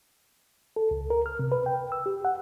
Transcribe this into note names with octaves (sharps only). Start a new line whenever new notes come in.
A4
C#2
A#4
F6
C3
B4
G5
E6
G4
F#5